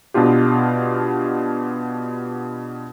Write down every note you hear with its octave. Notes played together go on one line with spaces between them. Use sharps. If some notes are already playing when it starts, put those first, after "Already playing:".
B2 B3 D4 F4 G4